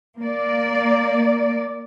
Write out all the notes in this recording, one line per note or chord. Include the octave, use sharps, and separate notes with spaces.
A#3 D5